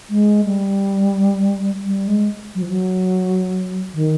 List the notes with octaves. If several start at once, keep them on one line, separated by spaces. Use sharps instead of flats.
G#3
G3
G3
G#3
F#3
F3
F#3
D#3